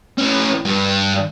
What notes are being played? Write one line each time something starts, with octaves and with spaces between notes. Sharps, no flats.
A2 C#4
G2